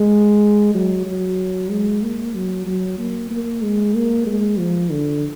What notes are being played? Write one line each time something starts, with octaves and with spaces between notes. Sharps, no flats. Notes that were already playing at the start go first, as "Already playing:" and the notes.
Already playing: G#3
F#3
F#3
G#3
A#3
F#3
F#3
A#3
A#3
G#3
A#3
G#3
F3
D3